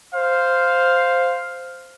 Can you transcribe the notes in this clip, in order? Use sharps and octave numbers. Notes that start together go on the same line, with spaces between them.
C5 F5